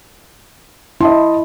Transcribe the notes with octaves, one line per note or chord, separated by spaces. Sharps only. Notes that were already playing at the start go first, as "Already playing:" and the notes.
E4 D#5 A5 C6